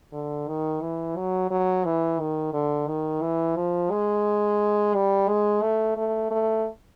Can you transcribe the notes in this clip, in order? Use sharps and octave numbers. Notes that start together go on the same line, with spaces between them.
D3
D#3
E3
F#3
F#3
E3
D#3
D3
D#3
E3
F3
G#3
G3
G#3
A3
A3
A3